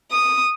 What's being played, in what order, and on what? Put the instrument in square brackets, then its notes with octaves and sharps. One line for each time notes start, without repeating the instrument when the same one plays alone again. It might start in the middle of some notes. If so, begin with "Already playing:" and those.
[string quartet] D#6